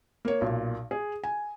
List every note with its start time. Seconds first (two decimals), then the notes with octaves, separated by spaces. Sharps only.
0.25 A#3 C#5
0.41 B1 A#2
0.91 G#4
1.24 G#5